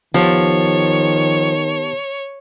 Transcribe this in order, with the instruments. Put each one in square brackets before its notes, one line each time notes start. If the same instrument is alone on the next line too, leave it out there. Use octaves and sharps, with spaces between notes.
[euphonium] D#3 [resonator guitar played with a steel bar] F3 [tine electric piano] B3 G4 A5 [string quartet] C#5